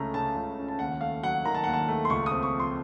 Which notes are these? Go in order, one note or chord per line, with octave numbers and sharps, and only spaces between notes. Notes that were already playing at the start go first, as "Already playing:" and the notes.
Already playing: C#2 A3 C#4 A#5
C#3 A5
C#2
C#4
A5
D#2 F#5
A3 F5
F#3 F#5
D#3 A#5
A5
D#2 F#5
A5
A3
C6
C#2 C#6
D#6
C4
C#6
F3
C6